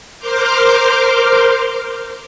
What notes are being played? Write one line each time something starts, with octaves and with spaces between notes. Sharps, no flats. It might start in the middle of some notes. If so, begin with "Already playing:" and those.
A#4 C5 C6 D6 F6 G6